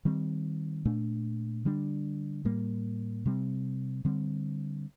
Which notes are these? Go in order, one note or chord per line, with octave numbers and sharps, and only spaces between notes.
D#3 G3 C4
A#2 A3 D4
D3 G3 D4
A2 G3 A#3
C3 G3 C4
D3 G3 C4